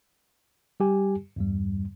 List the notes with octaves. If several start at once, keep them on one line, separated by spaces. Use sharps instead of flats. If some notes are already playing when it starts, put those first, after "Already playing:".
G3 G4 G#5
E2 G2 G3